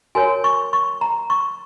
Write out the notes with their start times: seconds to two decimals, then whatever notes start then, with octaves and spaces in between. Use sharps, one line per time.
0.15 F#4 A#4 C#5 G#5
0.44 C#6
0.73 C#6
1.01 A#5
1.30 C#6